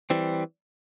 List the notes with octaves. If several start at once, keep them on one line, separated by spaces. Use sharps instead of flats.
E3 G3 C4